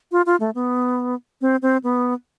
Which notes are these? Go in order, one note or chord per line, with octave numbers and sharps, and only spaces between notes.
F4
F4
A3
B3
C4
C4
B3